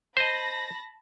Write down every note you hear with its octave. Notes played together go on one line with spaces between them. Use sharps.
C5 D#5 A5 B5 A#6